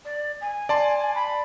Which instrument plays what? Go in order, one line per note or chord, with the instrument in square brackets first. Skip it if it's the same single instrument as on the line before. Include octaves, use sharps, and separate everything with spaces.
[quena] D5
G#5
[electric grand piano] D5 A5 C6
[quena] B5